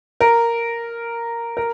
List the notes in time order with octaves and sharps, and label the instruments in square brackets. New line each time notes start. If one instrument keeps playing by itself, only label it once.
[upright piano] A#4
A#4